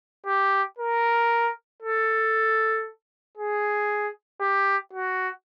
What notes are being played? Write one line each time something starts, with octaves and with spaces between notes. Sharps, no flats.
G4
A#4
A4
G#4
G4
F#4